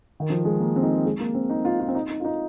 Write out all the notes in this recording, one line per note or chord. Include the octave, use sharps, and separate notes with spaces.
D#3
F3
G#3
A#3
C4
D#4
G#3
A#3
C4
D#4
F4
F4
C4
D#4
D#4
F4
D#4